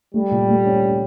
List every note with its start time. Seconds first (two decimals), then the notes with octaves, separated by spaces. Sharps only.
0.14 G3 A3
0.31 A#2
0.49 A3
0.65 C#4
0.82 C#4